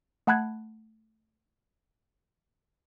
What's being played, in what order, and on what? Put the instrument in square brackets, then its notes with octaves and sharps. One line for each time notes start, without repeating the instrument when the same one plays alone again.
[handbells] A3 F#5 A5 B5 F#6 G#6